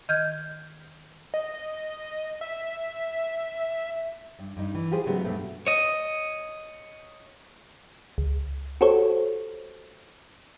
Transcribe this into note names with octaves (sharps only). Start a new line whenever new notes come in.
D#3 D#5 F6 G6 G#6
D#5
E5
G2
G2 D#4
E3
F4 G4 G#4 C5
G#2 C#3 F#3 A3 B3
G2 B2 A3
C#5 D#5
C#2
F#4 G4 A4 C5 C#5